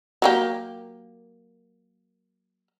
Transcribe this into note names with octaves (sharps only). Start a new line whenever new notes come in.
F#3 A#3 G4